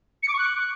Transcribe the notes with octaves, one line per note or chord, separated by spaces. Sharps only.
C#7
D6
C#6
F#6